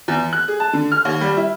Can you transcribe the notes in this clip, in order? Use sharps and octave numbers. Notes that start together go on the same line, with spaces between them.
E2
F#6
G#4
A5
D3
F6
D#2
G3
E4